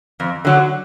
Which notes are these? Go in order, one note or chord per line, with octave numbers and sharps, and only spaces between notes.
F2
D3 F#3